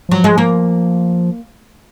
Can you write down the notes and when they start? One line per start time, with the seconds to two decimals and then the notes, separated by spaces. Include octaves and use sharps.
0.09 F3 F#3
0.24 G#3
0.38 A#3